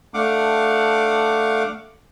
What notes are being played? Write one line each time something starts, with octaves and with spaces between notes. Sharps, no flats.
A3 D4 F5 F#5 D6